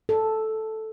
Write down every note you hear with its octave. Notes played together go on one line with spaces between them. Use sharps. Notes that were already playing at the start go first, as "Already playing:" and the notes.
A4